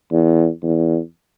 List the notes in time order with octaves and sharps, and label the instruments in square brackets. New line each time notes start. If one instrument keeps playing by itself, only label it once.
[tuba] E2
E2